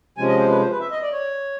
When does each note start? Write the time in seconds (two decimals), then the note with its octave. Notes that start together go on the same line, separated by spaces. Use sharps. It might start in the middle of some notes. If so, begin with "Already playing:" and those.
0.17 C3 F3 G#3 C#4 G#5
0.28 D#5
0.39 C5
0.49 B4
0.60 C5
0.71 B4
0.80 E5
0.91 D#5
1.02 D5
1.12 C#5